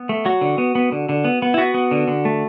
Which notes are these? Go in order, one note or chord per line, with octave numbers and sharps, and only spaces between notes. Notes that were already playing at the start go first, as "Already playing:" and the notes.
Already playing: B3
A3
F#3 F#4
D3
B3
B3
D3
D3
B3
B3
E4
B3 F#4
B3
D3
D3
A3